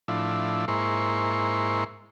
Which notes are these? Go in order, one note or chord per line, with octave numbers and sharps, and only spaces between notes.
A2 F3 D4 E4
G#2 A#3 E4 C5 C#6